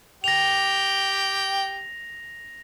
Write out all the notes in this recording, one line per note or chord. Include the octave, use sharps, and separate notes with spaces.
G4 G5 A#6 F7